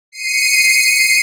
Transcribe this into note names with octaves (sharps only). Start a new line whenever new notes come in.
C7 C#7 D#7